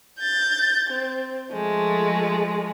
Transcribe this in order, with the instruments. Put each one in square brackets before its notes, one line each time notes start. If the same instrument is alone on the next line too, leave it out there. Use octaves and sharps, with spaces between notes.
[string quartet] G6 A6
C4
F3 G#3 A3